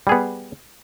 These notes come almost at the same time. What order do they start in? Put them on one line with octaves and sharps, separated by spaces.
G3 G#4 B3